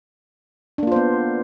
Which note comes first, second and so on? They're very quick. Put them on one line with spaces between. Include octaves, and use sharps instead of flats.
D4 A#3 F4 C5 B3